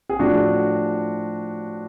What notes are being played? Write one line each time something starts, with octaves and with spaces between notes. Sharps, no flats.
G#4
A2 F3 D4 F#4